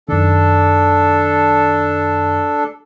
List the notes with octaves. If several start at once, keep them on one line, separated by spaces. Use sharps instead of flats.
F#2 D#3 D4 A4